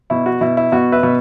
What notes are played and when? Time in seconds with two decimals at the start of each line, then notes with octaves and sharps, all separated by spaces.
0.10 B2 E4
0.26 F#4
0.41 B2 E4
0.57 E4
0.72 B2 F#4
0.92 B4 E5
1.03 B2